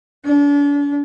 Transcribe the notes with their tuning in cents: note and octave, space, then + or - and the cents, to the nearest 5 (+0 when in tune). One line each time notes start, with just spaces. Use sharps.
D4 -40